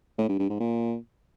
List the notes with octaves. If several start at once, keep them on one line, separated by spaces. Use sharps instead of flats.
A2
G2
G2
G#2
A#2